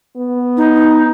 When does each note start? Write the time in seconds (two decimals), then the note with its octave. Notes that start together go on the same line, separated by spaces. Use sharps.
0.17 B3
0.57 D#4